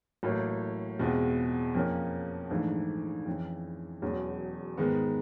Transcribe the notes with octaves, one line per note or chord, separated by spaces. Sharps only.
A1 A2 F#3 A#3
E2 B2 G#3 C4 F4
F2 C#3 F3 A#3 C#4
A#1 G#2 E3 A3 D4
F2 C#3 E3
E1 E2 C#3 F#3
G#2 D#3 G#3 B3